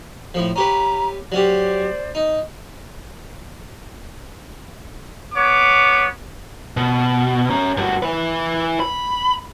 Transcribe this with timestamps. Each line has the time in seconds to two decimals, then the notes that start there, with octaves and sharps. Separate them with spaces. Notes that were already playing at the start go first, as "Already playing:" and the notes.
0.34 A2 F3
0.56 C#4 G4 B4 A#5
1.32 F#3 C#4 G4 C5 D5
2.15 D#4
5.34 B3 C#5 D6
6.77 B2
7.49 C#4 A#5
7.77 G2 F#4
8.02 E4 B4
8.80 B5